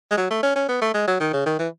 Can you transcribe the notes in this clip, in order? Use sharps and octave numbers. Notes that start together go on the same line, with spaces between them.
G#3
F#3
A3
C#4
C#4
B3
A3
G#3
F#3
D#3
C#3
D#3
E3